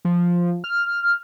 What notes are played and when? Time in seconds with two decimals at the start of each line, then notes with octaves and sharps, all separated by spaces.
0.05 F3
0.64 F6